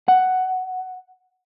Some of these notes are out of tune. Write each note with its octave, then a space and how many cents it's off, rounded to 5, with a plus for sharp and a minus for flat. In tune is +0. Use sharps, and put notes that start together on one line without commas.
F#5 +5